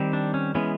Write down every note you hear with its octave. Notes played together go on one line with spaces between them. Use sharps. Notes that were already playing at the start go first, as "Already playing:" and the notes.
Already playing: D#3 G3 C4
D4
C#4
E3 G#3 B3 C#4